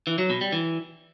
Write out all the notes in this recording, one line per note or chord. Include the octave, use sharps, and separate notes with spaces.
E3
F#3
B2
G3
E3